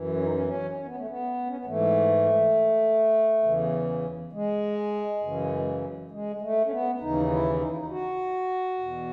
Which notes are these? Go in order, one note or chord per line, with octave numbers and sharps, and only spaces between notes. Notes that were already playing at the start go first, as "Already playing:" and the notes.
Already playing: F#2 E3
C#4
D#4
C#4
B3
C#4
C#4
B3
A3
B3
C#4
B3
G#2 E3 A3
E2 C#3 E3
G#3
F#2 C#3 E3
G#3
A3
C#4
B3
D#2 C#3 E3 D#4
E4
D#4
E4
D#4
F#4
E2 B2